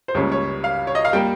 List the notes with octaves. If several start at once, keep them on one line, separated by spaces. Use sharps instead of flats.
C5
C#2 C#3 G3 A#3 C#5
C#5
F5
C#5
D#5
F5
G3 A#3 G5